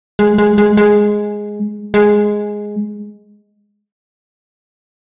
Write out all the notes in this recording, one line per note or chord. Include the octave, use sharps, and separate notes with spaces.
G#3
G#3
G#3
G#3
G#3